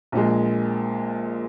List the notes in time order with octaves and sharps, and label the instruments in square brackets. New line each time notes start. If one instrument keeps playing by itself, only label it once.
[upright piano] A#1 A#2 G#3